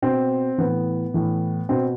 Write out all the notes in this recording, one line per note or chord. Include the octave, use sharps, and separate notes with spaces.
B2 C4
A2 E3 B3
A2 E3
B2 C4